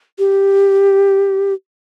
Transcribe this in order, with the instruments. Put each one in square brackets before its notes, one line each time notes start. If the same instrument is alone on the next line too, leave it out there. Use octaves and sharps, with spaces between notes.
[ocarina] G4